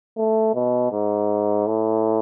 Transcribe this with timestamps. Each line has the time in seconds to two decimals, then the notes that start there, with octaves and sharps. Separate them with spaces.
0.17 A3
0.54 B2
0.92 G#2
1.67 A2